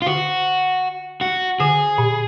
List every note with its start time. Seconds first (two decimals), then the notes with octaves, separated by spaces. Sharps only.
0.02 F4
0.06 D3 F#4
1.21 F#4
1.60 D3 G#4
1.98 A#2